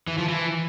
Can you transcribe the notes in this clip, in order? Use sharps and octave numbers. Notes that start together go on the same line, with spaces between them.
E3
F3
E3